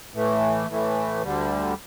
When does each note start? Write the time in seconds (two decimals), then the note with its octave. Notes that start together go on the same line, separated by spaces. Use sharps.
0.14 A2 E3 A3
0.68 A2 E3 A3
1.23 D2 D3 G3